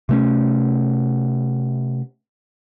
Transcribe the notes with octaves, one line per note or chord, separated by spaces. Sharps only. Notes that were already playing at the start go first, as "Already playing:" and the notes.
C3 A3 C#4